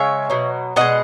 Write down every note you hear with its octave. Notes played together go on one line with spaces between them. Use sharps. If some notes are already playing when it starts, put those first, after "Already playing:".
Already playing: C#3 G#3 C#5 E5
B2 F#3
B2 G#3 D#5 F#5